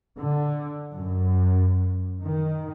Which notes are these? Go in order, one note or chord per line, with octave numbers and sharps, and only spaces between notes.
D3
F#2
D#3